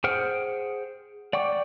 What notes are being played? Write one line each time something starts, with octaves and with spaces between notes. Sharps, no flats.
G#4 C5 F#5 G5 F6
D5 F#5 G5 C#6 D6